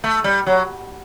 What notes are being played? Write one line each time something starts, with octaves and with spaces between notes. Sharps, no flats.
A3
G3
F#3